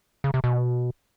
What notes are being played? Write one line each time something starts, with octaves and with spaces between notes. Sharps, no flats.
C#3
C3
B2